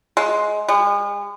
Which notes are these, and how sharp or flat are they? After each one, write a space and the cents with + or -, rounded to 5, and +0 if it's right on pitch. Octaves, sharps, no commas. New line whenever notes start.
G#3 +15
G#3 -40